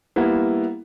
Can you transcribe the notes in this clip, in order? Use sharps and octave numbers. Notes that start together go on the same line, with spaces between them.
G3 A#3 B3 E4